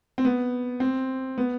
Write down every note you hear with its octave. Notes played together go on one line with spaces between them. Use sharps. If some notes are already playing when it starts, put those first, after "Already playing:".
C4
B3
C4
B3